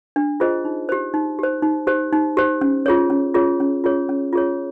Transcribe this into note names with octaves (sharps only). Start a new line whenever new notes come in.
D4
F4 G#4 C5 D#5
D#4
G4 C5
D#4
G4 C5
D#4
G4 C5
D#4
G4 C5
C#4
F4 G#4 C#5
C#4
F4 G#4 C#5
C#4
F4 G#4 C#5
C#4
F4 G#4 C#5